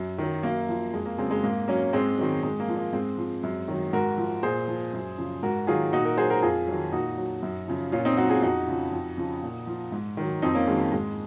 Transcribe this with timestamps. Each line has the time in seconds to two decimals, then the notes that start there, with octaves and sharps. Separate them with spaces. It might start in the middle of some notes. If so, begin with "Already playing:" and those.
Already playing: F#2
0.18 D#3 F#3
0.43 F#2 A#3
0.69 F3
0.93 F2 G#3
1.06 A#3
1.18 C#3 F#3 G#3 C4
1.31 G#3
1.43 G#2 A#3
1.68 F#3 A#3 C#4
1.93 G#2 G#3 C4
2.18 D#3 F#3
2.43 G#2 G#3
2.60 A#3
2.68 F3
2.77 A#3
2.93 G#2 G#3 C4
3.18 F3
3.43 F#2
3.68 D#3 F#3
3.93 G#2 F#4 A#4
4.18 F3
4.43 A#2 G#4 C5
4.68 F3
4.93 F#2
5.18 C#3 F3
5.43 G#2 F#4 A#4
5.67 D#3 F#3 F4 G#4
5.93 A#2 D#4 F#4
6.05 F#4 A#4
6.17 F#3 G#4 C5
6.30 F#4 A#4
6.43 F2 F4 G#4
6.68 D#3 F#3
6.92 A#2 D#4 F#4
7.18 F#3
7.43 F#2
7.68 C#3 F3
7.92 A#2 C#4 F4
8.05 C4 D#4
8.17 F#3 D#4 F#4
8.30 F4 G#4
8.42 F2 D#4 F#4
8.68 C#3 F3
8.92 F2
9.18 C#3 F3
9.42 A#2
9.67 F3
9.92 G#2
10.17 D#3 F#3
10.42 F2 C4 D#4
10.55 A#3 C#4
10.67 D#3 F#3 G#3
10.80 A#3
10.92 G#2 G#3